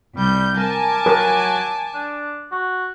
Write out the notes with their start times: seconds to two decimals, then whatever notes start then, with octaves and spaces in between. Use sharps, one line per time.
0.17 C2 G3 G6
0.57 A#4 G#5 A5 D6
1.06 F#3 A#4
1.95 D4
2.52 F#4